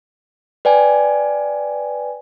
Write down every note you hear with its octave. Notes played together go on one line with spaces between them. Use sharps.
B4 D5 G5 G#5